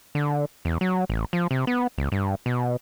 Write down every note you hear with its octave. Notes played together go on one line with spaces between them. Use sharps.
D3
E2
F#3
A1
F3
C3
B3
C#2
G2
B2